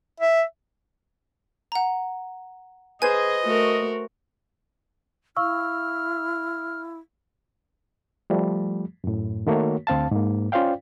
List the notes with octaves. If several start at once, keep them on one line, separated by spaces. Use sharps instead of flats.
E5
F#5 A#5
G#4 B4 C5 D#5 G#5 D#6 G#6
A3 F#4 A#4
E4 F5 C#6 E6 F6
F3 G3 A3
F#2 A2
D#3 A3 A#3 F#4 A#4 C#5
D2 C4 F5 A5
G#2 A#3
C#4 F4 C5 D5 F5 G5